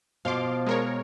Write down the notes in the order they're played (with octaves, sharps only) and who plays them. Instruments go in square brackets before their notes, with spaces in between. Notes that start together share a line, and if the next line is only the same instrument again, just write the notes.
[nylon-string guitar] B2 [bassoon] F3 [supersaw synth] F5 C6 D6
[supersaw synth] G#3 A#4 C#5